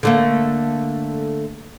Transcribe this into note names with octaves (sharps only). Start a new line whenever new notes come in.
D3 A3 A#3